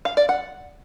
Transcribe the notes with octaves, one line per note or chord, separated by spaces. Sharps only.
F5
D5
F#5